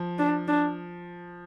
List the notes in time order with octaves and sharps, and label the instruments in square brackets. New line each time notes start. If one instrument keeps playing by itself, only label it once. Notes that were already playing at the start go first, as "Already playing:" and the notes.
Already playing: [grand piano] F3
[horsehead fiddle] D4
D4